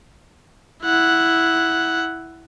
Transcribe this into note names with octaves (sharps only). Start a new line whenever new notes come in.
E4 F#5